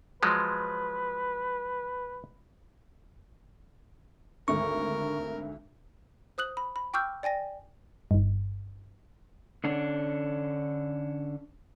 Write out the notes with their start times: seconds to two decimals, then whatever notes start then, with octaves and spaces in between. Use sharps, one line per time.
0.23 F3 F#3 G#3 B4
4.48 G#1 D2 D3 A#4 C#6
6.38 C5 D#6 F#6 F#7
6.57 B5
6.76 B5
6.94 G5 C#6 D6 E6 F6 G6
7.23 D5 G5 G#5 A#6
8.11 G1 G2
9.64 D3 C#4 D4